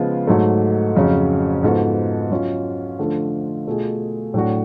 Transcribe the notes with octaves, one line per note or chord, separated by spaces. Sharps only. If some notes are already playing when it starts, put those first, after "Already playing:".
Already playing: C#3 F3 G#3 B3 F4
G#2 F#3 A3
F2 C#3 F#3 C#4
G#2 F3 B3 F#4 A4
F#3 C#4 F4
D3 F3 A3 F4 A4
B2 A3 F4 G#4
A2 F#3 A3 D4 F#4